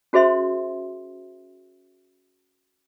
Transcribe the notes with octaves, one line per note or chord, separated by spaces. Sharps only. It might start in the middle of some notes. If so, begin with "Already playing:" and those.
C#4 F#4 G#4 C5 E5 C6